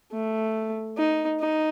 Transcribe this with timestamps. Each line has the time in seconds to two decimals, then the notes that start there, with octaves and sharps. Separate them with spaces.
0.12 A3
0.97 D#4
1.41 D#4